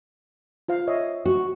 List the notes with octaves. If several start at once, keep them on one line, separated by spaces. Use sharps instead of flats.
F4 C5 F5
C#5 D#5 E5
F#4